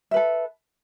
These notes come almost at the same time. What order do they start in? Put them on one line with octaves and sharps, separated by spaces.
E5 B4 A4